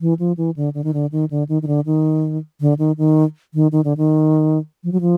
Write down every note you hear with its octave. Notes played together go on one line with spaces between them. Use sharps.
E3
F3
E3
D3
D3
D#3
D3
D#3
D3
D#3
D#3
D3
D#3
D3
D#3
D#3
D#3
D#3
D3
D#3
F3
F#3
F3